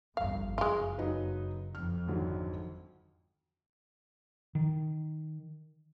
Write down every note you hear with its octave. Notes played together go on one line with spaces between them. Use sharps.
G1 C2 F2 F5
F#1 G#3 F4
F#3 D#4 B4
F2 F6
G#1 D3 F#3
D#3